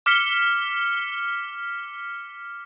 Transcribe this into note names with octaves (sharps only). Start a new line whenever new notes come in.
D6 F6 B6 C#7 G7